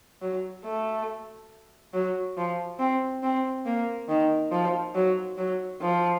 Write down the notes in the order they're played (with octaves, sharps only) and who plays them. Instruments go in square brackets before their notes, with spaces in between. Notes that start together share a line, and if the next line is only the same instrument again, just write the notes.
[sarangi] F#3
A3
F#3
F3
C4
C4
A#3
D#3
F3
F#3
F#3
F3